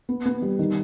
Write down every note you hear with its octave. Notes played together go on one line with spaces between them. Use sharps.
B3
B3
G3
D#3